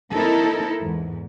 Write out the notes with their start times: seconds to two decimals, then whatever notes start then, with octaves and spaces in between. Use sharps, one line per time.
0.14 A#3 C4 D#4 E4 A4 A#4
0.79 E2 G#2